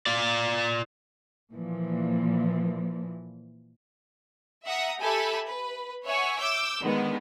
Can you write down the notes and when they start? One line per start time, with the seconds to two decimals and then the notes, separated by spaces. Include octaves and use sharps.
0.06 F4 D5
1.52 A#2 E3 F3
4.66 E5 F#5 A#5 D#6
5.00 G4 A4 E5 G#5 A5 B5
5.46 B4
6.05 C#5 E5 F#5 G#5 C#6
6.40 D6 E6 G6
6.82 D3 D#3 G#3 B3